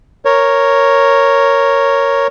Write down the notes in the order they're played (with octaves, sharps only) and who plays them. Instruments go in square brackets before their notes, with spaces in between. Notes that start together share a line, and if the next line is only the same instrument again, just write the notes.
[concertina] A#4 C#5